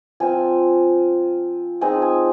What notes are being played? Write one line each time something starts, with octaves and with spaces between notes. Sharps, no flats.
F3 C4 F4 G#5
F3 G#3 C4 D#4 G#5
G#5